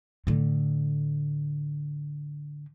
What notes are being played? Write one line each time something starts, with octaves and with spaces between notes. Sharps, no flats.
A2 D3